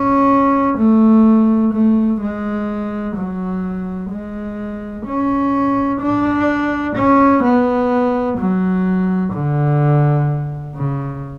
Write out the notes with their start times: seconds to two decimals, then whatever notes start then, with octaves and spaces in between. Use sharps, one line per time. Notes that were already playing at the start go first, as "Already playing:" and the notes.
Already playing: C#4
0.78 A3
1.73 A3
2.21 G#3
3.16 F#3
4.11 G#3
5.06 C#4
6.01 D4
6.96 C#4
7.43 B3
8.38 F#3
9.33 D3
10.76 C#3